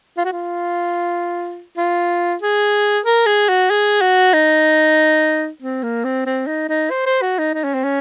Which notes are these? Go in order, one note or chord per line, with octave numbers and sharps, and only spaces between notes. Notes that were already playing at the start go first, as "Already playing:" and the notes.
F4
F#4
F4
F4
G#4
A#4
G#4
F#4
G#4
F#4
D#4
C4
A#3
C4
C4
D#4
D#4
C5
C5
F#4
D#4
D#4
C#4
C4
C#4